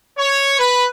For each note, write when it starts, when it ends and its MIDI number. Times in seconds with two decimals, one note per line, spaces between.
0.17 0.55 73
0.58 0.84 71